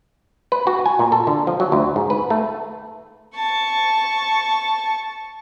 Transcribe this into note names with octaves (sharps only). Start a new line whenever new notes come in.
B4
F#4
G#5
A#2
A4
D3
F3
F#3
D2
G#2
B4
A3
A5 C#6